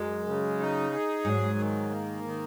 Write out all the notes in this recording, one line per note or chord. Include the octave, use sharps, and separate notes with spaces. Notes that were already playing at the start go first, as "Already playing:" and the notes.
Already playing: F#2 G#3
C#3
D#4
G#4
G#2 F#3
D#3
A#3
D#3